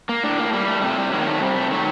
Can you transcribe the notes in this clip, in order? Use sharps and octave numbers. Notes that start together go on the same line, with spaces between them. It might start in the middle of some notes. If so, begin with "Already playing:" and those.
A#3
A2 D4
A#3
G3 A#3
A3
C3 A3
G3
D#3 F#3 G3
A#3
A3
C3 G3
A3
D#3 F#3 A3